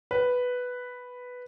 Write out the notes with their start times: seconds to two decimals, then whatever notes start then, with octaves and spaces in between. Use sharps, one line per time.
0.11 B4